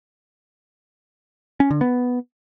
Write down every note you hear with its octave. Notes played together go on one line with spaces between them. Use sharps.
C#4
D3
B3